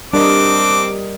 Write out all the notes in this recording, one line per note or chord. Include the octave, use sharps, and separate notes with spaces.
G3 C4 D4 A#4 D#5 D6